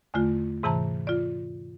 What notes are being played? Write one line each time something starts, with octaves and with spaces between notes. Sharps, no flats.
E2 D3 A3 F4
G#2 C3 E3 A5 A#5
F4 D5